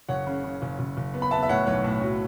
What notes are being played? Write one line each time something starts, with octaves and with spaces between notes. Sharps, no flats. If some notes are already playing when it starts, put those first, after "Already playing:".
F#1 C#5 F#5
C#3
C#3
F#1
F#1
F#1
B3
B5
B3 E5 A5
E5
A2 C#5 F#5
B1 C#5
A2
F#3